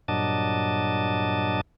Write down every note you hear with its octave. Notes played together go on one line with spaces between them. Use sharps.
G2 A#2 F#3 D4 D#5 A5